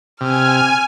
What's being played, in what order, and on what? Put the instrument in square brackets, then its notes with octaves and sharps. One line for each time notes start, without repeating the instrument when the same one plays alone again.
[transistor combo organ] C3 [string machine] G#5 [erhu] F6